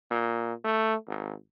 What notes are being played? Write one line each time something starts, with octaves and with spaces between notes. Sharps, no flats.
A#2
A3
G#1